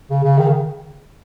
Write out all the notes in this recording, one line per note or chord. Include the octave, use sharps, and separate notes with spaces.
C#3
C#3
D#3
C#3